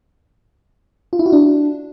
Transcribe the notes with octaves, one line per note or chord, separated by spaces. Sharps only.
F4
E4
F#4
D4